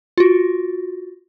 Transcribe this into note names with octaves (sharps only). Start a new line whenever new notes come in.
F4 F#4